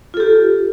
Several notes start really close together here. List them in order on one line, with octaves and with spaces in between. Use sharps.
F4 A4 G4